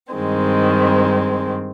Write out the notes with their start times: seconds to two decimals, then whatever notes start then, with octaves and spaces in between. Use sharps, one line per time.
0.13 G2 D#3 G#3 C4